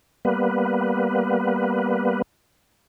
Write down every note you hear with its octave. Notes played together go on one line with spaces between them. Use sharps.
G3 A#3 B3 B4